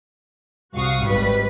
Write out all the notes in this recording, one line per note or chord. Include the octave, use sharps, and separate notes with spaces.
C2 F#4 F5 C#6 D#6
G#1 G3 B4 B6